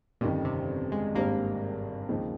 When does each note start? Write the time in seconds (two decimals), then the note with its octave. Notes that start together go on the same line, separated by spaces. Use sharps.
0.21 G1 F2 A#2 D#3 G3 C#4
0.45 C3
0.92 G#3
1.15 G#1 G2 G3 A#3 C4
2.09 D#2 C#3 F3 C4 D#4